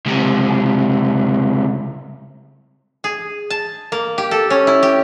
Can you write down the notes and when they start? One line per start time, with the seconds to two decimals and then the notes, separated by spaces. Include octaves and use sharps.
0.06 C#2 C3
3.04 G#4
3.50 A5
3.92 A#3
4.18 G4
4.31 A4
4.50 C#4
4.67 E4
4.83 G4